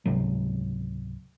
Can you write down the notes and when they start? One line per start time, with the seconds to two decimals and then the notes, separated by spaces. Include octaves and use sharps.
0.06 C#2 G#2 C3 F#3